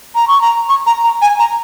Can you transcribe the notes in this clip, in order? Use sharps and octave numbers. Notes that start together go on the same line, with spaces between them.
A#5
C#6
A#5
C#6
A#5
A#5
G#5
A#5